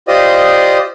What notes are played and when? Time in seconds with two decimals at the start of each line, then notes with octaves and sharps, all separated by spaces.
0.08 F4 G4 C5 D5 D#5 D#6